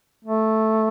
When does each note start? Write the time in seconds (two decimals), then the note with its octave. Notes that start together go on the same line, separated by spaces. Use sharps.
0.25 A3